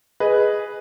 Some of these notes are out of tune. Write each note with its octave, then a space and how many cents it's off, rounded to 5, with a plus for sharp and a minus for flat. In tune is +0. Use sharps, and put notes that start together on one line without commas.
G#4 +0 B4 +0 D#5 +0